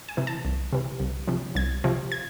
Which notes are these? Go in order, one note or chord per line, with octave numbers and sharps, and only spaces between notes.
G#5
C3 E3
A5
C2
C3 E3
C2
C3 F3
C2 G#6
C3 F3
G#6